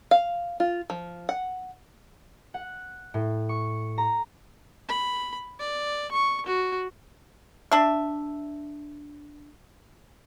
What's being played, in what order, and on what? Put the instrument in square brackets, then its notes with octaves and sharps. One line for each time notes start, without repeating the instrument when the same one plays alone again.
[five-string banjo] F5
F4
F3
F#5
[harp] F#5
A2
C#6
A#5
[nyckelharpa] B5
D5
C#6
F#4
[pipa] D4 E5